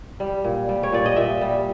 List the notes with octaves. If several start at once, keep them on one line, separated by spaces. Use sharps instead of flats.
G3
A#2
G3
C#5
A#2 D5
D#5
A#2 E5
G3